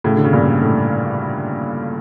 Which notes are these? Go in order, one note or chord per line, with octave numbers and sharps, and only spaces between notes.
A2 C#3
D3
C#3
G2 A#2
A2